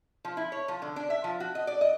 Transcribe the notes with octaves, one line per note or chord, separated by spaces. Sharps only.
F3
E4
C#5
F3
D3
D4
E5
F3
F#4
D#5
D5
D#5